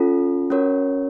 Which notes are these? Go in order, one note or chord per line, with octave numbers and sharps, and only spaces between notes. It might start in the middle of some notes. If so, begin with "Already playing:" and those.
Already playing: C#4 F4 A4
C#4 F#4 A#4 C#5